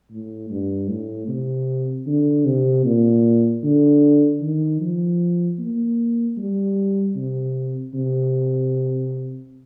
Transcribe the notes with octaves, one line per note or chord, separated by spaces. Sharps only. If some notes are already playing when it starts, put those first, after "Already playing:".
A2
G2
A2
C3
D3
C3
A#2
D3
D#3
F3
A#3
G3
C3
C3